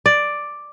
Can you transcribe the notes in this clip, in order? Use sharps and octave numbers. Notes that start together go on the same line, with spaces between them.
D5